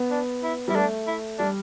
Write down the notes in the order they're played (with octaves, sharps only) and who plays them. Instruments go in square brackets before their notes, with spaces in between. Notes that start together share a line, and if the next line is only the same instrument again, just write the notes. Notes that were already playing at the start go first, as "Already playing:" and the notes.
Already playing: [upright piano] B3
[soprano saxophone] D4
E4
[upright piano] G3 [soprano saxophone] E4
[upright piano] A3 [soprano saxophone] D4
[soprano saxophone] E4
[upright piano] G3 [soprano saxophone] D4